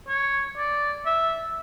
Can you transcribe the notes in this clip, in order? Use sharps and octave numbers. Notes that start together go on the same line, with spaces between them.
C#5
D5
E5